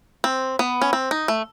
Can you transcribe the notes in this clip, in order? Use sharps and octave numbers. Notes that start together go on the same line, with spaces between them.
C4
B3
C#4
C4
D#4
A3